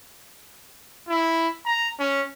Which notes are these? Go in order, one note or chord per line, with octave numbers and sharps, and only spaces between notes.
E4
A#5
C#4